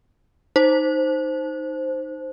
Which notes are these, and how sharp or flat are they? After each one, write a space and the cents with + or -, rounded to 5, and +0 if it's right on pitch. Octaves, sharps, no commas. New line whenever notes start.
D#4 +0 C5 +0